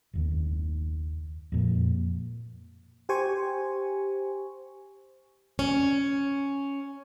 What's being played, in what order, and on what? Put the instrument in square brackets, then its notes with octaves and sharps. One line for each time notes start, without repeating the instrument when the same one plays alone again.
[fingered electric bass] F#1 D#2 D#3
F2 A#2
[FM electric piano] G4 C5 G#5 C#6
[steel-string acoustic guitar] C#4